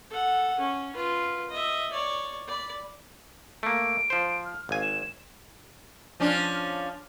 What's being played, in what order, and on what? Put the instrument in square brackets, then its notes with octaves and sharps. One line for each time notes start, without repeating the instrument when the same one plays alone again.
[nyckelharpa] A4 F#5
C#4
F4 B4
D#5 E5
C#5 D5
D5 B5
[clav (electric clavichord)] A3 A#3 [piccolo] D7
[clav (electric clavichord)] F3 C5
[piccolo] F6
[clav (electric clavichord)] G#1 G#5 [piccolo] F5
[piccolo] E7
[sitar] F3 C#4 D4